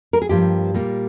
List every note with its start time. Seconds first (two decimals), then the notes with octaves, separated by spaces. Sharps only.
0.13 A#4
0.22 G#4
0.29 G2 F3 A#3 G4
0.74 A#2 G3 A#3